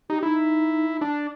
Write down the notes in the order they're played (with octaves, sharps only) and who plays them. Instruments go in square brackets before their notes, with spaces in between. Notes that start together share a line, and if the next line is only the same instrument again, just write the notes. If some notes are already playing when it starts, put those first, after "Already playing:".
[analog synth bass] D#4 [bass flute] G4
[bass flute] D#4 [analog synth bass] E4
[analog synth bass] D4